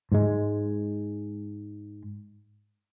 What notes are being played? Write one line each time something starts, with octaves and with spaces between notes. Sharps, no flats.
G#2 G#3